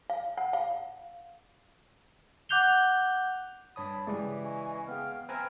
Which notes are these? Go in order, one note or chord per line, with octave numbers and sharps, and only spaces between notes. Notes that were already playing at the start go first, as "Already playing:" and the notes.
F5
F#5
F5
F#5 D6 F#6 G6 F7 G7
G2 C#5 A5 B5 D#6
C#3 E3 G#3 G4 D5
D#5 G#5 C#6
B3 G#4 F5 G5 F6
C4 B4 E5 G#5 A#5 F6